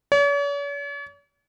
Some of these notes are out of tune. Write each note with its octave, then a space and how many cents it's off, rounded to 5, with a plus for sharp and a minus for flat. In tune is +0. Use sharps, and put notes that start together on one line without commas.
C#5 +45